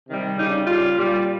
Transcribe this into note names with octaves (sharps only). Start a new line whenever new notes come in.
C3 D#3 G3
C#3 G3 D#4
C#3 G3 F4
A#2 G3